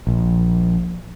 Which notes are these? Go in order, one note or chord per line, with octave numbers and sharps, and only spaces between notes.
A#1